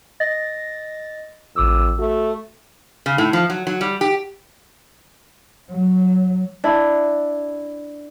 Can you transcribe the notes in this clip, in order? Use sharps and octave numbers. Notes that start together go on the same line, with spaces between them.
D#5 A6 A#6
A1 F2 D6 E6
A3 F#4
C#3
A2
F3
F#3
F#3
G3
G4
F#3
D4 E4